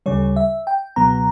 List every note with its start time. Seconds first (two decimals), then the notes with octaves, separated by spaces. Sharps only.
0.06 D2 C#3 G3 C#5
0.36 E5
0.67 G5
0.96 C#2 B2 F#3 B3 A#5